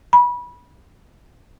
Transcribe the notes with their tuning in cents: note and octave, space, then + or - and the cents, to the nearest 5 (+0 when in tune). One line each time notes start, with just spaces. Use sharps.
B5 -25